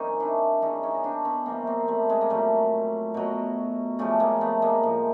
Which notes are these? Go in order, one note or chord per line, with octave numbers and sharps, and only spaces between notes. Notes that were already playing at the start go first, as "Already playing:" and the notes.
Already playing: C3 D#3 G3 C#4 D#4
D4 E4
C#3 E3 G3 C#4 D#4
C#4 D#4
D#4
C4 D4
B3 C#4
C3 E3 G3 A#3 C4
A#3 C4
G3 A3
G#3
A#3
A#2 F#3 G3 A3
B2 F#3
C#3 F3 G3 A3
G#3 A#3
A3 B3
G#3 A#3
A2 F3